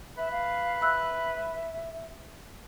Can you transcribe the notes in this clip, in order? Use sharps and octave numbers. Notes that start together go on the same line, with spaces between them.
B4 E5
F5
E5 B5 E6 F#6